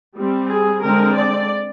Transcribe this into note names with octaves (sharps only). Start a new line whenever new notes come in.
G3 C4
G#4
D3 G#3 C4 A#4
D5